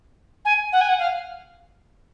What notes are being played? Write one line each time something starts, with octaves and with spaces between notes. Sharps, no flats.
G#5
F#5
G#5
F#5
F5